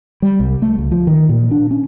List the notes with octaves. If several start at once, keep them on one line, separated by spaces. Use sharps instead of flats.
G3
C2
A3
C#2
F3
D#3
A#2
D4
C#4